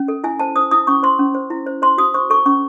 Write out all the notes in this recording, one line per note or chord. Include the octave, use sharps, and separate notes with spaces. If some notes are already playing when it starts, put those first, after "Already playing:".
Already playing: C#4
A4
E4 G#5
C5 A5
C5 D#6
E4 D#6
C#4 C#6
C5 C6
C#4
C5
E4
C5
C5 C6
F#4 D#6
C5 C#6
A4 C#6
C#4 C#6